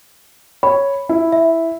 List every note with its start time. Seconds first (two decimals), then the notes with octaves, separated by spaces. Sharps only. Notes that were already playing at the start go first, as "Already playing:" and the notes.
0.63 C#5 B5
1.09 E4
1.32 E5